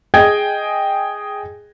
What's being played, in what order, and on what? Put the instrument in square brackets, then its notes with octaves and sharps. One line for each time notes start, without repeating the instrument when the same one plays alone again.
[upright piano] G#4 D#5 G5 G#5 G#6